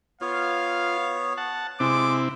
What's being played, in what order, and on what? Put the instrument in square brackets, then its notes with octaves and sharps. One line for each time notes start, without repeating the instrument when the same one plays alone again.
[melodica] B3 C#5 [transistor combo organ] F4 [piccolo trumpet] F5
[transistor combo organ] F#5 A5
[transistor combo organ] C3 C4 E4 [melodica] G#3 [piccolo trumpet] D6